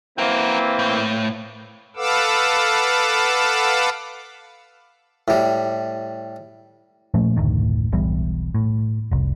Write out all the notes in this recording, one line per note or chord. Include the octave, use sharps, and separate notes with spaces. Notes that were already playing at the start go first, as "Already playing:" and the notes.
E3 A#3 C4 F#4 A#4
A2
A4 B4 F5 F#5 D6 E6
A2 G3
A#2 F3 A3 C#4
F#1 D2 A2 D#3
E1 B1 E2 G3
A2
F1 C2